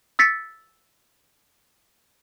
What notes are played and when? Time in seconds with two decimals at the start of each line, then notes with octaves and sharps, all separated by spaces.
0.19 E6 A6 B6 C#7